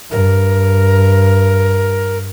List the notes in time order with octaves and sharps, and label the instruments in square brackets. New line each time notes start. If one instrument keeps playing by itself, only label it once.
[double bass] G2 [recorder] A#4